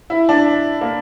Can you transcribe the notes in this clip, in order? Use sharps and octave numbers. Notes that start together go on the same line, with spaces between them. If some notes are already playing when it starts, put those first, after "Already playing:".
E4
D4
A#3